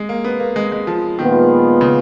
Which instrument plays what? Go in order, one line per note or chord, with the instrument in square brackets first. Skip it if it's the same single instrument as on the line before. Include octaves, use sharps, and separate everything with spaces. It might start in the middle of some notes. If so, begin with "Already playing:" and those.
Already playing: [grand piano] G#3
A#3
B3
A#3
G#3
G#3
F3
[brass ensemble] A#2 F3 G#3 B3 F4 [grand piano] D#3
[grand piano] C#3